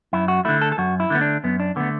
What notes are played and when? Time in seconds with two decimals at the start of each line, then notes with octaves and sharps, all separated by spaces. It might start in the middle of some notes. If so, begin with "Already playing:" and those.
0.13 F#2 E4
0.28 F#4
0.45 D3 A3 E4
0.62 A4
0.72 A4
0.78 F#2 F#4
1.00 E4
1.10 D3 A3 B3
1.21 D4
1.44 F#2 B3
1.60 D4
1.76 D3 A3 B3